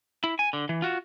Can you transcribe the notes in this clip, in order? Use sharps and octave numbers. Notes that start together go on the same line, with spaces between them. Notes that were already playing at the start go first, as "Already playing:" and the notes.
E4
G#5
D3
E3
F4 F#4